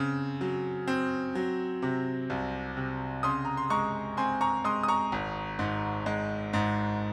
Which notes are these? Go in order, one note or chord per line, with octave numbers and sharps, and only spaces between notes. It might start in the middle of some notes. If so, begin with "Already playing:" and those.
Already playing: C#3 C4
F#3
C4
F#3
C3
C2
C3
C#3 C6 D#6
A#5
C6
G#3 A#5 C#6
C4 G#5 C6
A#5 C#6
G#3 C6 D#6
D#6
A#5 C#6
G#1
G#2
G#3
G#2